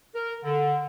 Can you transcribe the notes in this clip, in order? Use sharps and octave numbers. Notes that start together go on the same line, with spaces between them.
A#4
D3